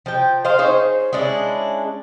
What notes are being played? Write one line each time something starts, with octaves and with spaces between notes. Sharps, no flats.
F3 G5
C5 D#5 F5
D#4 G#4 C5 C#5
G#3 C#4 D4 E4